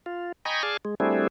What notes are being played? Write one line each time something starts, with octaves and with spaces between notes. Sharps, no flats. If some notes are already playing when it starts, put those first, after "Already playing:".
F4
D#5 G5 G#5 A#5 B5 C#6
G#4 D5 F5 G#5 A5
G#3
G3 A3 C4 D4 E4 G#4